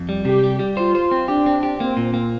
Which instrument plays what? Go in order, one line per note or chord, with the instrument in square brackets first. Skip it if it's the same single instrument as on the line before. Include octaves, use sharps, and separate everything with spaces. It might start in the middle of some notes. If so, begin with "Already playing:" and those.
Already playing: [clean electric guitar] F2
G3
[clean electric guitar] C3 [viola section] G4
[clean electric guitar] G3
G3
[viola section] F4 [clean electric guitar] C5
[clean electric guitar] C5
C4
[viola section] D4 [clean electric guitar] G4
[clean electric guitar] C4
G4
[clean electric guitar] A#3 [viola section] C4
[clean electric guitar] A#2
A#3